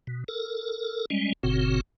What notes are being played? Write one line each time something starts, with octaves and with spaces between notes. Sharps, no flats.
B2
A4 A#4
G3 G#3 C#4
F#1 A#2 C#3 C4 F#4